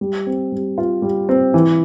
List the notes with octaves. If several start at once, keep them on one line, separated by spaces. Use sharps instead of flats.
G3
C4
G3
F4
G3
C4
E3